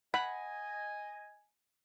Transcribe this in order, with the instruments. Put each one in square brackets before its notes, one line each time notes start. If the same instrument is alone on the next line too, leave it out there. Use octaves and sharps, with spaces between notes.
[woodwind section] D#5 G#5 [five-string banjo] F#5 [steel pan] B5